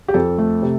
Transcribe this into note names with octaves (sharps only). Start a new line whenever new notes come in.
G4
F2 A4
A3
C3